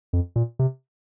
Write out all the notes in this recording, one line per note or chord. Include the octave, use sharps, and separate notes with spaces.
F2
A#2
C3